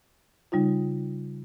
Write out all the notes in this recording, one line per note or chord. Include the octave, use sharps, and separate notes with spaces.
C#3 G3 D#4 F4